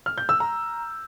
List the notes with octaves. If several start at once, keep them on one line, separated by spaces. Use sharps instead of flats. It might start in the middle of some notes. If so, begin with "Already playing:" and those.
F6
G6
E6
A#5